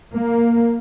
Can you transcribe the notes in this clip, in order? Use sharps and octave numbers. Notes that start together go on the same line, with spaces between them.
A#3